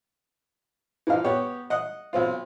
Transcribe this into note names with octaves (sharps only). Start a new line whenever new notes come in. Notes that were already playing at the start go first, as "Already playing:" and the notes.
E3 F3 D#4 F5
B3 G4 C#5
D#5 F#5
B1 C4 F4